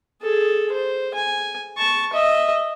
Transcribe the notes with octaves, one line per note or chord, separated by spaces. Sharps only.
G#4 A4
C5
G#5
A5 C#6
D#5 E5